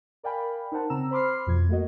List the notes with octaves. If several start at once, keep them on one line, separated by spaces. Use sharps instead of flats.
A#4 D5 F5 G5 G#5 B5
D#4 A#4 C5 F#5 A5
C#3 C4 A#5 E6 E7
C5 B5 C6 D6 F6 C7
F2 B2 F3 G#6
A3 A#3 F#4 D#5